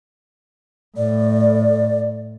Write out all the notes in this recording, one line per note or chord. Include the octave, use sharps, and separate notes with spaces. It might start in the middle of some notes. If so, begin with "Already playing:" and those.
A2 D5